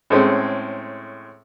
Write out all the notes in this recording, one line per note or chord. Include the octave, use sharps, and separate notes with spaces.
A2 G#3 C4 C#4